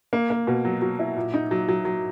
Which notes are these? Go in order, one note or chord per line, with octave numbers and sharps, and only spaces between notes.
A#3
A#3
B2
F#3
F#3
E4
A#2
D#4
F#3
F#3
F#3